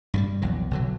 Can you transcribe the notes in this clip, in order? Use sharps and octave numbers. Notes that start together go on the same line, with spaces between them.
G2 F#3 G3
A#1 E2 F#3
B1 D3 F#3